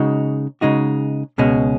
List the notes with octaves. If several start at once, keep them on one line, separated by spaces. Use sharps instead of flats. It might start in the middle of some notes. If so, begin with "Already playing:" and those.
Already playing: C#3 G#3 D#4 F#4
C#3 G#3 D#4 F#4
C#2 B2 G#3 C#4